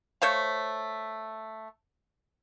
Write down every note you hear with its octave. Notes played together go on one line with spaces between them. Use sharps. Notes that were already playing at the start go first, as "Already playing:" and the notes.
A3 C5 C#5 F5